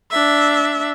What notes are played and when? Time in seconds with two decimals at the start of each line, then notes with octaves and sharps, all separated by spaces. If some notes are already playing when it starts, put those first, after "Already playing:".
0.11 D4 E5